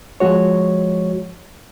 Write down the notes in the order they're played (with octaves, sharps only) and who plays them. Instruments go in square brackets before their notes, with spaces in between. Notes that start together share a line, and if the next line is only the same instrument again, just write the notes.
[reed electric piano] F3 G#3 F#4 C#5